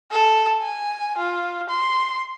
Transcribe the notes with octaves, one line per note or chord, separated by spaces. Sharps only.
A4
G#5
F4
C6